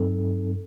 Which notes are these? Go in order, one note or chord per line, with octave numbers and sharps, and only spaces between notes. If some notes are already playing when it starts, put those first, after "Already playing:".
Already playing: G2 F#3 C4 D#4 A4